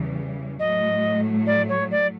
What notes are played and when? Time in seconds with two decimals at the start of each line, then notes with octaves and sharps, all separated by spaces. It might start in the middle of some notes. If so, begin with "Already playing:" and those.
Already playing: E2 C#3 E3 G3
0.59 A2 F#3 A3 D#5
1.46 D5
1.68 C#5
1.91 D5